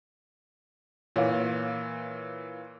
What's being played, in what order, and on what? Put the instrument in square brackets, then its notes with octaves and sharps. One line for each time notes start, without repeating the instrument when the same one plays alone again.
[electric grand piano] A#2 E3 [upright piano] C#5 F5